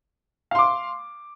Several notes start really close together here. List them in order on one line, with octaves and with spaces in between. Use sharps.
F5 C6 D6